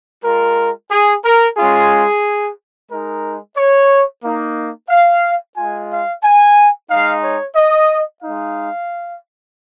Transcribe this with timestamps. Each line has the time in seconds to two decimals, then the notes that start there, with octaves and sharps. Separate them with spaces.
0.24 G#3 F4 A#4
0.91 G#4
1.25 A#4
1.57 G#3 C#4 F4 G#4
2.90 G#3 D#4 A#4
3.56 C#5
4.23 A#3 D#4
4.90 F5
5.57 G#3 F4 G#5
5.90 F5
6.22 G#5
6.90 G#3 D#4 F5
7.24 C#5
7.56 D#5
8.23 G#3 D#4 F5